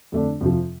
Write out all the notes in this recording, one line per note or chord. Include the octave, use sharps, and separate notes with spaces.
F2 D3 A3 D4
F2 C3 F3